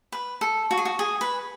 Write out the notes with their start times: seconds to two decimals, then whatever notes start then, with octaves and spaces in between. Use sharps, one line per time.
0.12 B4
0.41 A4
0.71 F#4
0.78 G#4
0.85 F#4
0.99 G#4
1.21 B4